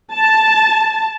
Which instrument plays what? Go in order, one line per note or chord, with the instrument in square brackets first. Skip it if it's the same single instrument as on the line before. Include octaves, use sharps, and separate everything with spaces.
[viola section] A5